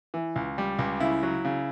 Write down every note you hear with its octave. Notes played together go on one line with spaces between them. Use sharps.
E3
C#2
G3
C#2
C#3 E4
F#3
C#3